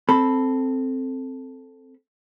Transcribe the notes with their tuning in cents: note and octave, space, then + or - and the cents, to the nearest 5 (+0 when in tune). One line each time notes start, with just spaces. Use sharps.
C4 +0 A4 +0 B5 +0